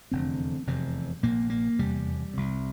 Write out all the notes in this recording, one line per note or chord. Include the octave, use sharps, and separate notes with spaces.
F1 E2 D3 C4
F1 E2 C3
A#1 A#2 A#3
A#3
F1 E2 C3 G3
C2 C3